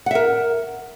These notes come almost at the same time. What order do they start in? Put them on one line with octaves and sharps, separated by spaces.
F#5 E5 A#4